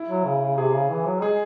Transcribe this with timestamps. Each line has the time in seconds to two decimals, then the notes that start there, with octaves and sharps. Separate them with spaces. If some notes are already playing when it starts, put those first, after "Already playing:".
Already playing: E4
0.09 F#3
0.25 C#3
0.41 C#3
0.57 C3 G#4
0.73 C#3
0.90 E3
1.05 F#3
1.22 G#3 G#4